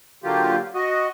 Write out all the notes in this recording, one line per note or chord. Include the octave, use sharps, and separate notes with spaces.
D3 F#3 A#3 F4 G4
F#4 D#5